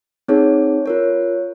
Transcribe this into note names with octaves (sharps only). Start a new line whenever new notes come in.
C4 D#4 G#4 C#5
F4 A#4 C#5